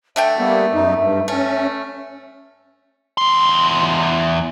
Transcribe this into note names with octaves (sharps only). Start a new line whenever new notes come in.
D3 A3 E5 G5
G3 A#3 B3
F#2 D#4
G2
A3 C#4
E2 C6